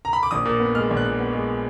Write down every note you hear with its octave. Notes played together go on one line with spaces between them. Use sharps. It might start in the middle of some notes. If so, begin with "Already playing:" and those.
A#5
B5
D6
A#1 D#6
A#2
B3
G#3 F6
A#1
F#6
A#2
B3
G#3